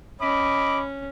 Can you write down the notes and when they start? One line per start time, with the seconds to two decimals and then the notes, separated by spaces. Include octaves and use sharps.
0.20 C#4 D#5 B5 D6